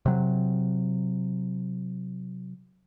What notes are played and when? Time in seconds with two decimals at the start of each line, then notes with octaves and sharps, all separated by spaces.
0.06 C3 F#3